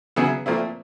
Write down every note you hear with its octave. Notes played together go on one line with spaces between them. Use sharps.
C#3 F#3 B3 E4 G#4
A#2 F3 A3 C4 E4